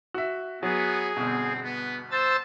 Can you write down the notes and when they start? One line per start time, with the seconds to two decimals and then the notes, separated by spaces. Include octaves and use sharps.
0.14 F#4 E5
0.63 F#3 B3 G#4
1.17 G1 B2 C4
1.63 B3
2.11 C5 A5 E6 A6